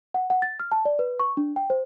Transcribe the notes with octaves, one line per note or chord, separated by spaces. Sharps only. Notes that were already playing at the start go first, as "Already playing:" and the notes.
F#5
F#5
A6
F6
A5
D5
B4
C#6
D4
G5
C5